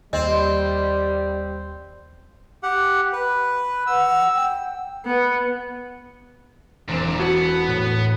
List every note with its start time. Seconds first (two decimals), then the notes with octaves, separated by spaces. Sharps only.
0.13 D#2 G3 C4 D#5
2.63 G4 F#5
3.13 B4
3.87 F#5 E6
4.36 G5
5.06 B3
6.88 E1 A#2 C4 D4
7.20 B3 F#4 A4 F#5
7.67 A2